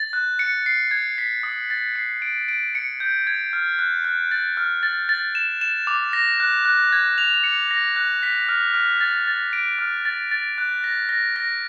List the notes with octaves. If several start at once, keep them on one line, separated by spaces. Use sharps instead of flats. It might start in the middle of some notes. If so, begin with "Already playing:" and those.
Already playing: A6
F#6
C#7
C7
G#6
B6
D#6
A6
C7
D7
D7
C#7
G6
G#6
F6
F#6
F#6
A6
F6
A6
A6
E7
E7
D6
A#6
F#6
F#6
G#6
F7
C#7
A#6
F#6
B6
F6
F6
A6
A6
D7
F6
A6
A6
F#6
A#6
A#6
A#6